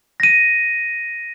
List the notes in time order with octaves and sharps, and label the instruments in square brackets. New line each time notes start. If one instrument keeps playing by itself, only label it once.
[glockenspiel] A#6 D#7